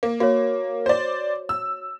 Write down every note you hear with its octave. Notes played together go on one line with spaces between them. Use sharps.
A#3
A#3 F#4 C#5
C5 D5
E6